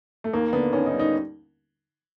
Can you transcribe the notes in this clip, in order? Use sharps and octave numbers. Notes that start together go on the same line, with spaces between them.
A3
D#2 A#3
D3 B3
D#2 C#4
D#4
G3
D#4